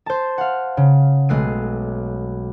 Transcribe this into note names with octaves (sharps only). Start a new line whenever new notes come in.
C5 A5
F5 F#5
C#3
B1 G#3 A3 F#6 C7 D#7